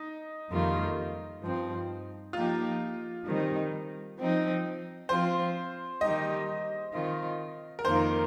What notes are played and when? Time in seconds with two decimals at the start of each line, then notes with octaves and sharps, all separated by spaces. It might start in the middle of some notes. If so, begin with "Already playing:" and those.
Already playing: D#4
0.49 F2 D#3 G3 A#3 F4
1.41 G2 F3 C4
2.33 F3 A#3 D#4 F4 G4
3.25 D#3 G3 C4 D#4
4.17 F3 C4 D#4
5.09 F3 C4 F4 C5
6.01 D#3 G3 D#4 G4 D#5
6.92 D#3 C4 F4
7.79 A#4
7.85 F2 D#3 A#3 F4 C5